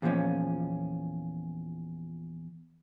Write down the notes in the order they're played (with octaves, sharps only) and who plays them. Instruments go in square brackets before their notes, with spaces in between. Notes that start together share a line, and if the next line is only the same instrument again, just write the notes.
[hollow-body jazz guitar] E2 A#2 E3 F3 C#4